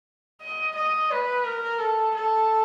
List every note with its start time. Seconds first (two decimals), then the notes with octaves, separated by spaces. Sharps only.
0.41 D#5
0.76 D#5
1.11 B4
1.46 A#4
1.80 A4
2.15 A4